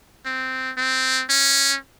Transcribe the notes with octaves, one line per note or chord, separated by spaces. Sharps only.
C4
C4
C#4